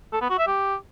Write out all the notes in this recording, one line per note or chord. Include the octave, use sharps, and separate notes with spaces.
A4
B3
F#4
E5
G4